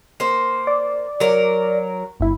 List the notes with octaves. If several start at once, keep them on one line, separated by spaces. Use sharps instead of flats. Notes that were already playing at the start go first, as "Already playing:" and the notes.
A#3 C5
D5
F#3 A#4
G1 E4